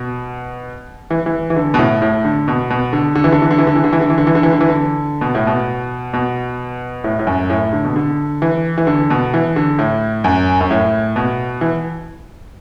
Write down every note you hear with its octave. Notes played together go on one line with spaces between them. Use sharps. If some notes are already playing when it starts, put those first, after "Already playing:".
Already playing: B2
E3
E3
E3
D3
B2
A2
A2
D3
B2
B2
D3
D3
E3
D3
E3
D3
E3
D3
E3
D3
E3
D3
E3
D3
E3
D3
E3
D3
E3
D3
B2
A2
B2
B2
A2
A2
F#2
A2
D3
B2
D3
E3
E3
D3
B2
E3
D3
A2
F#2
F#2
A2
B2
E3